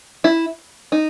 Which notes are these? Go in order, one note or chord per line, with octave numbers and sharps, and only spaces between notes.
E4
D#4